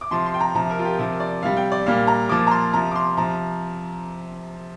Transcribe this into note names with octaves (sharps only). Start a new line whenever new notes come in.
D6
C3 F3 C6
C6
G5
A#5
C3 F3 A#5
A#4
F4
G4
C3 F3 A#4
D5
C3 G3 F5
G5
D5
A#2 G3 F5
A#5
A#2 F3 D6
A#5
C6
C3 F3 A#5
D6
C6
C3 F3 A#5